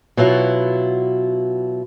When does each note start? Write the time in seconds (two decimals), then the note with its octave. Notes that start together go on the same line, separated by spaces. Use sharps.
0.17 B2 F#3 E4 F4